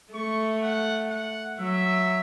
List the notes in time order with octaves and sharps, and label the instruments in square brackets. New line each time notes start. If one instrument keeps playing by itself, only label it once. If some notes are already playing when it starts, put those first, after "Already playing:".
[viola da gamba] A3 [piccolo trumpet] C#6
[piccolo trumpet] F#5
F#5
[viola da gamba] F#3 [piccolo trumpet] E5